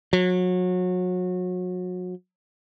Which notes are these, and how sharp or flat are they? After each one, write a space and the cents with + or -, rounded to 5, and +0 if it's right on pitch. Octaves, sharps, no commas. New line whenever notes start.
F#3 -30